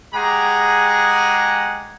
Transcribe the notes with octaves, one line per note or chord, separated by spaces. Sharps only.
G#3 G4 G#4 F#5 A#5